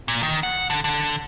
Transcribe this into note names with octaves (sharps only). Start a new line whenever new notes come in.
A#2
D#3
F#5
D3
D3